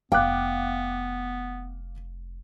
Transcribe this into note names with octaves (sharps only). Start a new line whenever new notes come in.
F1 B3 F5 G5 D6 F#6